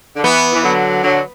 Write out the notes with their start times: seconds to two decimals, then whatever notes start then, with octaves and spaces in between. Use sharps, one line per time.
0.17 D3
0.24 E3 B3
0.54 E3
0.63 D3 F#3
1.04 D3 F#3